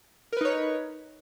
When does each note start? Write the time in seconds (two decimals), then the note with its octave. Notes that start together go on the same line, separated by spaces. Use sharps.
0.33 A#4
0.37 B4
0.41 D#4
0.45 C#5